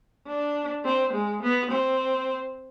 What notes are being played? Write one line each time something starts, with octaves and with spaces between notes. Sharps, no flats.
D4
C4
G#3
B3
C4